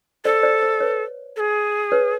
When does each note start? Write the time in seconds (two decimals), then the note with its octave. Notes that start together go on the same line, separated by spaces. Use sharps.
0.25 A4 C5 D5
0.43 C5 D5
0.62 C5
0.80 B4 C#5
1.36 A4
1.40 G#4
1.92 B4 C#5